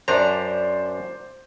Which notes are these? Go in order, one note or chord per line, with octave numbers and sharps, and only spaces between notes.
F#2 D4 C5 D5 A#5